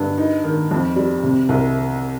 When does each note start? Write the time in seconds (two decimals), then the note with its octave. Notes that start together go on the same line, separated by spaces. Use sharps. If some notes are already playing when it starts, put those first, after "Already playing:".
Already playing: G2 D3
0.18 D#4
0.44 D#3
0.71 F2
0.96 G3
1.23 C3
1.49 C2